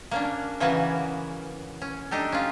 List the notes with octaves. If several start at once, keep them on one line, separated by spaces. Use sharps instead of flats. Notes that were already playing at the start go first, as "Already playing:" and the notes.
A#3 C#4 D4
C#3 E3 A#3 B3 C#4 F#4
C#4
D4 D#4 G4 A4
C#4 F4